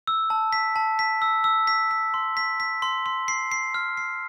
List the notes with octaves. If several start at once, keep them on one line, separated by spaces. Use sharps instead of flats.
E6
A5
B6
A5
B6
E6
E6
B6
B6
C6
B6
B6
C6
C6
C7
C7
F6
C7